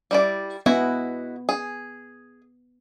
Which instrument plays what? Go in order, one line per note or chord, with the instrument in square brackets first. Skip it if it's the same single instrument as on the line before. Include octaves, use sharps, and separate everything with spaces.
[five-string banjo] G3 E4 D5
[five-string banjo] G#3 E4 F#4 [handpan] B3
[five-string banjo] G#4